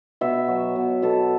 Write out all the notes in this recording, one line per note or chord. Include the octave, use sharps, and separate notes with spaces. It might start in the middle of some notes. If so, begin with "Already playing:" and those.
B2 E5
F#3
B2
B2 A4